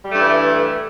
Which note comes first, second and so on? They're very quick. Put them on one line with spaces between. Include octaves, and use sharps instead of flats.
G3 A3 G2 E3